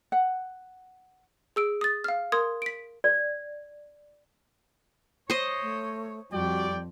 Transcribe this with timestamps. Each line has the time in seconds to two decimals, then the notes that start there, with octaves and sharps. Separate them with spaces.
0.12 F#5
1.56 G#4 E6 D7
1.81 D#6 A6
2.04 F5 F6
2.32 A#4 C6 D#6 G#6
2.62 B6 D7
3.04 D5
5.30 C5 C#5 D#5
5.62 A3
6.32 F2 G3 F#4 D5 G5